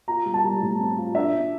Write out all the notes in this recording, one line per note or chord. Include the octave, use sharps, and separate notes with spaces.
F4 A#5
G3
A5
G3
A2
C4
F4
D4 E5
D4